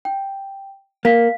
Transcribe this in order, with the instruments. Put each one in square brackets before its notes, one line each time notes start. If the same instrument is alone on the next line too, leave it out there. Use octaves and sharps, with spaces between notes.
[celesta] G5
[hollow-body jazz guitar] A#3 [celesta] F5 B6